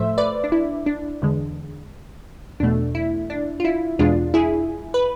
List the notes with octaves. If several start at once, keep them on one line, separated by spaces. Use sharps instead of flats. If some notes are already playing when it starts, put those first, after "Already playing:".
Already playing: A2 F3 A3 C5 E5
B4 D5
D4
E4
D4
E2 D3 G#3
E2 B2 A3 D4
E4
D4
F4
E4
E2 B2 G#3 D4 F4
E4 G#4
B4